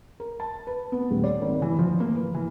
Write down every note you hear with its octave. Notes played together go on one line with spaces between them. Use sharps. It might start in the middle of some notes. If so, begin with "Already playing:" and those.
A#4
A5
B4
B3
D#1
D5
G#1
E3
F3
A#3
B4
E3